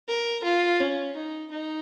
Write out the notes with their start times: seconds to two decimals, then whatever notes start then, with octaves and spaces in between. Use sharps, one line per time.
0.08 A#4
0.44 F4
0.80 C#4
1.16 D#4
1.51 D#4